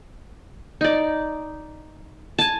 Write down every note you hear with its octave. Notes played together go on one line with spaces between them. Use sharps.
D#4 D5
G#5 A5